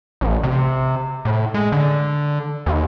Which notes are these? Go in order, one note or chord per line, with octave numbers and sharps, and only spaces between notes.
A1
C3
A2
G#3
D3
D#2